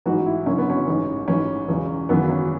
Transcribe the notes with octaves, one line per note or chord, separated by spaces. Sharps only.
A1 G#2 E3 F#4
E4
F#1 F#2 D3 C#4
B3
C#4
A1 G#2 E3
A1 G#2 E3 C#4
E1 E2 C#3 E3
G#1 F#2 C#3 E3 B3
C#4